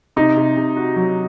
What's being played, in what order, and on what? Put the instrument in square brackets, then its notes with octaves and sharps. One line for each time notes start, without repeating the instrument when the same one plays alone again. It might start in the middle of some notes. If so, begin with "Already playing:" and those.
[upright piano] C3 [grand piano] D#4
[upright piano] C3
C3
F#4
F#3